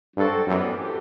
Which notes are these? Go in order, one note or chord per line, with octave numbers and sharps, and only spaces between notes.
G2 F#3 C4 F#4 A4
F#2 A2 E3 G3 B3
E3 A3 C4 G4